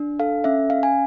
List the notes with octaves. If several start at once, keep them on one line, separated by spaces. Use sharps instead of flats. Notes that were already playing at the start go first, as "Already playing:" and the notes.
Already playing: D4
A4 F5
C#4 E5
C#4 F5
G#5